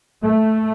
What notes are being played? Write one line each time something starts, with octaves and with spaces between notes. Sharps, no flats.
A3